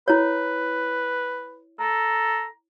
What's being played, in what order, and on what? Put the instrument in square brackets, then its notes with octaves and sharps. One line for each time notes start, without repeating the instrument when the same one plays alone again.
[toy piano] E4 C#5 [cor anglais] B4
[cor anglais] A4 [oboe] A#5